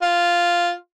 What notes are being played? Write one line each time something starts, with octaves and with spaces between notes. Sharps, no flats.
F4